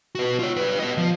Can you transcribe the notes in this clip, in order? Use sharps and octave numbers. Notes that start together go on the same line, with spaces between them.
F#4 B4
F4 C#5
G3 B4
B3 D#5
F3